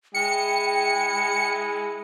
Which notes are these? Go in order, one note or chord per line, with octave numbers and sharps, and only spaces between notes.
G#3 E4 G5 C#7